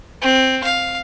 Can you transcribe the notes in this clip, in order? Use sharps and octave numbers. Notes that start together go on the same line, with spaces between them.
C4
F5